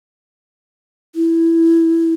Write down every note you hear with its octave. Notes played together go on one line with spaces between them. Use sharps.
E4